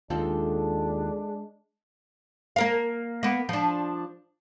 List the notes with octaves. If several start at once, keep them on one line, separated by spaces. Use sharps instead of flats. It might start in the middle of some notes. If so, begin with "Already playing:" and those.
D#2 G#3 C4 D4 F4 A4
A#3 A#4 F5
A#3 B3
F3 D4